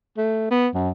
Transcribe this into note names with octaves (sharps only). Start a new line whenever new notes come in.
A3
B3
F#2